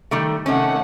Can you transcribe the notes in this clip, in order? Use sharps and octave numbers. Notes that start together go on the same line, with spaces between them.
D#3 G3 A3
C3 D#3 A3 C#4 F#5